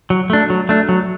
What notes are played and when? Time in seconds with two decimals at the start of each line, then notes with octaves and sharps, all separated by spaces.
0.10 F#3
0.30 A3 D4
0.50 F#3
0.69 A3 D4
0.89 F#3